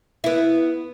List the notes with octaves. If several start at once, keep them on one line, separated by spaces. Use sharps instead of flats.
B3 E4